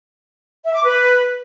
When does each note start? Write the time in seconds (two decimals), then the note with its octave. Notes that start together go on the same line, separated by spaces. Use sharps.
0.64 E5
0.73 D6
0.83 B4